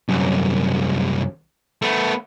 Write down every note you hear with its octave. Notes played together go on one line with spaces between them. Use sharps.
C2 F#2
A3 B3